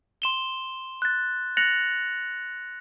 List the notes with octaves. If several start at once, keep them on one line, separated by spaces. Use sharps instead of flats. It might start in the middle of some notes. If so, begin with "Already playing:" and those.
C6 E7 G7
F#6 A6
F#6 A6 A#6 C#7 F7 F#7